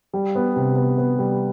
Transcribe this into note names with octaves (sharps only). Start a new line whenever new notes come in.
G3
B3
C3
B3
B3
G3